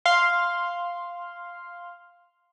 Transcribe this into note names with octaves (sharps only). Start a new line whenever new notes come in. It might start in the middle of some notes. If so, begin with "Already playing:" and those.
F5 C6